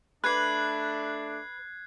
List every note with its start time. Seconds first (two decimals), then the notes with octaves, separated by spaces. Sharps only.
0.24 A3 D4 B4 D6 F#6 G#6 C7